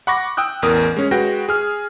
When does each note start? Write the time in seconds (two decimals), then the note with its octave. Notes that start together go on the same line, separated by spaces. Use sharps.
0.07 F#5 B5 C#6 D6 A#6
0.37 G5 D#6 E6 F#6
0.62 A1 E2 A#4 D#6
0.97 G#3 C#4
1.11 G#3 F#4 B4 G5 A#6
1.49 G#4 F6